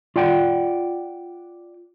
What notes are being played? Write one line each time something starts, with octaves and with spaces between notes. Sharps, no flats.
F4 D5 F#5 G5